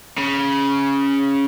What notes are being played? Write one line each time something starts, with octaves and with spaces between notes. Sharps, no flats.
C#3